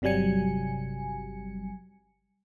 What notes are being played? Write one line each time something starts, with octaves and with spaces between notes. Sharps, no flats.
G1 C3 F#3 G3 G#5 C#7